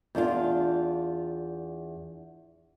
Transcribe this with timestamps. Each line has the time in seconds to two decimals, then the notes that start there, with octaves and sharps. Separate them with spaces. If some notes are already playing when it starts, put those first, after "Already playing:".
0.15 E2 D4 F4